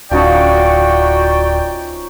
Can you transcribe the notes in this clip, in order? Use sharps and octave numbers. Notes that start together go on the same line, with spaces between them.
D1 F3 C#4 D#4 F#4 D5 G5